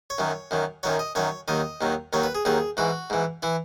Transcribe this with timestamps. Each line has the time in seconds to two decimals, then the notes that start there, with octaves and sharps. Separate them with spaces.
0.10 C#5
0.18 F#2 D#3 F#3
0.51 F#2 D#3 F#3
0.83 F#2 D#3 F#3 C#5
0.99 D#5
1.15 F#2 D#3 F#3 C#5
1.48 D#2 D#3 F#3 D#5
1.81 D#2 D#3 F#3
2.13 D#2 D#3 F#3 C#5
2.23 B4
2.35 G#4
2.45 D#2 D#3 F#3 G#4
2.77 G#2 E3 F#4
3.10 G#2 E3
3.42 E3 E4